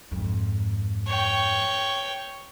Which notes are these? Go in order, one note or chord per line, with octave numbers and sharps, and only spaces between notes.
F2 G#2
C#5 G5